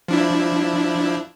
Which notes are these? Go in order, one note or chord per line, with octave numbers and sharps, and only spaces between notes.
F3 D4 E4